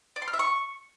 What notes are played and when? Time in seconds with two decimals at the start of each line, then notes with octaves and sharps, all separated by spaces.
0.16 D5
0.22 C6
0.28 F6
0.34 E5
0.39 C#6